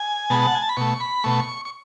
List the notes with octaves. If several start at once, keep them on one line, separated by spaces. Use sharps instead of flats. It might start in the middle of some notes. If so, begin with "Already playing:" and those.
Already playing: G#5
B2 G#3 B3 A5
F#5
G#5
A5
B5
B2 A3 C#6
B5
B2 A3 C#6
C#6